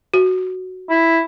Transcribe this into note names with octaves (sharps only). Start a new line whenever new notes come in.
F#4
E4